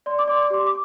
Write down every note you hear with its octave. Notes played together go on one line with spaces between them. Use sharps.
D5 C6
D6
D5 C6
D6
G4 C6
D6